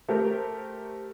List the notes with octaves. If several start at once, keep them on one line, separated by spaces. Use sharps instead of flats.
A3 G4 A#4 C5